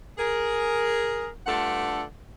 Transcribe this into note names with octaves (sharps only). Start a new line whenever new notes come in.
G#4 A#4
G2 A3 D4 F4 A4 F#5